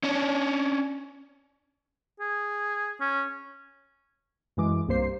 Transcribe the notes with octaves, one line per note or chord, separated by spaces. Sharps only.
C#4 D4
G#4
C#4
F#2 E3 G#3 D6
C2 G2 A#3 C5 C7